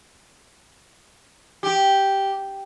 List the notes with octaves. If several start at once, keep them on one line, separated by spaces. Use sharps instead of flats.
G4